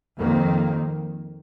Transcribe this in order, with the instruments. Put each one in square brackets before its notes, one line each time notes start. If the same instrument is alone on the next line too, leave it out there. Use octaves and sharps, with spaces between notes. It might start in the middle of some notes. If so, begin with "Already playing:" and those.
[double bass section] F2 D#3 A#3